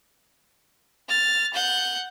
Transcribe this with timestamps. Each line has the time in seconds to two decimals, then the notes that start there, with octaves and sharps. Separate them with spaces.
1.09 F6 A6
1.54 F#5 G6